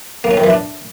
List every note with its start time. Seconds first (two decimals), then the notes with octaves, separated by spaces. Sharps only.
0.24 A#3
0.31 C#4
0.37 D#3
0.44 E3
0.50 D4